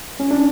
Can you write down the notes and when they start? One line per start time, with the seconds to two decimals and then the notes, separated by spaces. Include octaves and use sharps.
0.20 C#4
0.31 D4